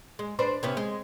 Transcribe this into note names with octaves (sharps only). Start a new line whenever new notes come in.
G#3
D4 B4 C5
C3 B3 C#4
G#3